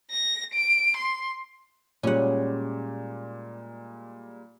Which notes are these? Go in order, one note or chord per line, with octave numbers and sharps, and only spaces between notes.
A#6
D7
C6
A#2 G3 G#3 C#4 F#5